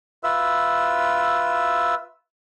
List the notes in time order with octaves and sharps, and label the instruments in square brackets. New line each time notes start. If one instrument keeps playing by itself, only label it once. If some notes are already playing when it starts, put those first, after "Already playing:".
[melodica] F4 B4 E5 E6